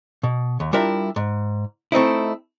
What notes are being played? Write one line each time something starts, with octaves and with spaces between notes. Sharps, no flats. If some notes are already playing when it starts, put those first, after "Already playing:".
B2
D#2
G3 D4 E4 F4 A#4 E5
G#2
A3 C4 D#4 E4